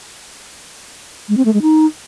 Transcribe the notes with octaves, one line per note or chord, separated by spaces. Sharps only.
G#3
C4
A3
G#3
D#4